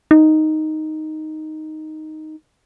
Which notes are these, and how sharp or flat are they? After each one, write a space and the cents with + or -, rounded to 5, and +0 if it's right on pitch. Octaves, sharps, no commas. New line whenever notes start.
D#4 +0